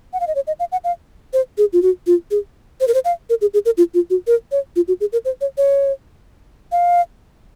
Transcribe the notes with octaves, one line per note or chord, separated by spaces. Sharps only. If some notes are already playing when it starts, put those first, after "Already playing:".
F#5
F5
D#5
C#5
D#5
F5
F#5
F5
C5
G#4
F4
F#4
F4
G#4
C5
A#4
C5
F5
A#4
G#4
G#4
A#4
F4
F4
F#4
A#4
C#5
F4
F#4
G#4
A#4
C5
C#5
C#5
F5